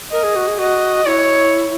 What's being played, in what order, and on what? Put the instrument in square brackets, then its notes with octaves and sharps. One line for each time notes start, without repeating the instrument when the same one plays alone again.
[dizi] A#4 [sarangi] D#5
[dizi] G#4
F#4
G#4
[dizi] F#4 [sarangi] D#5
[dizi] E4 [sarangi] C#5